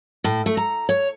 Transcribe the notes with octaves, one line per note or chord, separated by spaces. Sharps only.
A2
A3
A#5
C#5